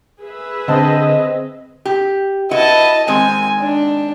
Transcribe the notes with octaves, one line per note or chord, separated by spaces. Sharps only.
G#4 B4 E5
D3 C4 C5 D#5 A5
G4
E4 F#4 B4 D#5 A5
D#3 G#3 C4 G#5
D4